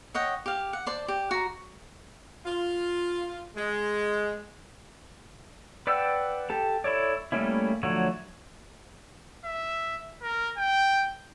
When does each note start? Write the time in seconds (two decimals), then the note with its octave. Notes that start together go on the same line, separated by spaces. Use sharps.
0.14 C#5 D#5 F#5 G5
0.46 G4 F5
0.73 F#5
0.86 C5 D5 A5
1.08 G4
1.31 F#4 A#5
2.45 F4
3.56 G#3
5.87 B4 D5 F#5 G5 E6
6.50 G4 A4
6.84 E4 A4 C#5 D5
7.32 G3 A3 A#3 C#4 E4
7.83 D3 F3 F#3 A3 C#5
9.45 E5
10.22 A#4
10.58 G5